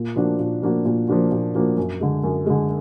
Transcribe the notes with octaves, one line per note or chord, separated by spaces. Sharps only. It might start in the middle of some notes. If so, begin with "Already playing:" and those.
Already playing: A#2
F3 A#3 D4 F#4
A#2
F3 A#3 D4 F#4
A#2
F3 A#3 D4 F#4
A#2
F3 A#3 D4 F#4
F#2
D3 G#3
F#2
D3 G#3